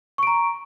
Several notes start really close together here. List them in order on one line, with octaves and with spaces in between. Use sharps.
C#6 D7 A#5